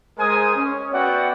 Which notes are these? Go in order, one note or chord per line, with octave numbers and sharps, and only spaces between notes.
G#3 A#4 C5 G#5 D#6
C#4
B3 F#4 D5 E5 F#5 G5